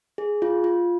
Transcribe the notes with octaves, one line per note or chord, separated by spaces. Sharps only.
G#4
F4
F4